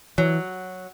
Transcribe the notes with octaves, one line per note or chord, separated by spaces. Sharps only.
E3 F#3